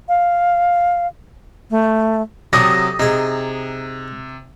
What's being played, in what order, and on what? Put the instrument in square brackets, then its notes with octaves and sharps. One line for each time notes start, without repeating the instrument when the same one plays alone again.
[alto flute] F5
A3
[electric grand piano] C3 F#3 [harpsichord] G4 A4 D5 [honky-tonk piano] D#6 A#6
[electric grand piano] C3 [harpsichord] D#4 G#4